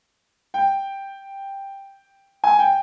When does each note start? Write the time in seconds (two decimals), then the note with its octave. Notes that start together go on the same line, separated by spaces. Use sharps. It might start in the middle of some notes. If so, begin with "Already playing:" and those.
0.54 G5
2.44 G#5
2.59 G5